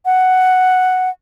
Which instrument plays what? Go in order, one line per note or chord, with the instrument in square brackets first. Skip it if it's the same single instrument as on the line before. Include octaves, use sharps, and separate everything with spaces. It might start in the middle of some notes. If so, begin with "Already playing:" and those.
[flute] F#5